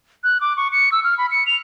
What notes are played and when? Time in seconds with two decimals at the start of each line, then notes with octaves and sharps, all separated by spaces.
0.24 F#6
0.41 D6
0.57 C#6
0.72 C#7
0.92 E6
1.04 F6
1.18 B5
1.31 C#7
1.47 F7